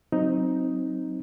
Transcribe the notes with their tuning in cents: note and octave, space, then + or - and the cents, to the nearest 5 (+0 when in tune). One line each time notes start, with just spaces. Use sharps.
F#3 +0 C4 +0 D#4 +0